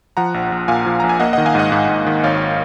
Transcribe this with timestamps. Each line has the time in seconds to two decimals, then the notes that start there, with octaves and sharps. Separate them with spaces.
0.17 F3 F#5 A#5
0.34 A#1
0.52 A#1
0.68 A#2 F5 G#5
0.86 F3
1.00 A#1 A#5
1.09 G#5
1.20 A#3 D#5 F#5
1.33 D#3 D#5 F#5
1.46 F5 G#5
1.55 G#2 D#5 F#5
1.72 G#2
1.89 G#2
2.06 D#3
2.24 G#1 C#5 F5